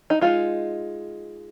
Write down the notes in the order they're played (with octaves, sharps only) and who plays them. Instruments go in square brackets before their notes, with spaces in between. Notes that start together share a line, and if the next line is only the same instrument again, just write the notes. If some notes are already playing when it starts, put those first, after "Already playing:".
[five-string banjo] D#4
G#3 D#4 F4